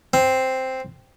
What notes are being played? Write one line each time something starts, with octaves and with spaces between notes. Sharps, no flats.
C4